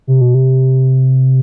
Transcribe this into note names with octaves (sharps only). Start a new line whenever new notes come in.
C3
B2
C3